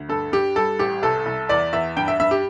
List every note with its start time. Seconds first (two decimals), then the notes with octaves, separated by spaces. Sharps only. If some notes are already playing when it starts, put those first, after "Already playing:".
Already playing: D2
0.09 G2 A4
0.33 G2 G4
0.56 G3 A4
0.79 A1 G4
1.03 C2 A4
1.26 C2
1.49 E2 D5
1.73 E2 E5
1.97 G2 G5
2.08 E5
2.20 G2 E5
2.31 G4